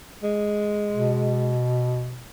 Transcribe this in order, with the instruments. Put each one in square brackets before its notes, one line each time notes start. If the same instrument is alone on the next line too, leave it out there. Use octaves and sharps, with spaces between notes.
[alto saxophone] G#3
[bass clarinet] B2